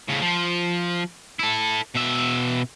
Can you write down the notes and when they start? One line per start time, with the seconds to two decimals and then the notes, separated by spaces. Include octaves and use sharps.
0.08 A2 C#3
0.22 F3
1.39 E4 A4
1.95 B2 E5